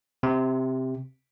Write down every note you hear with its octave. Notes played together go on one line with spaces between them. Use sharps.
C3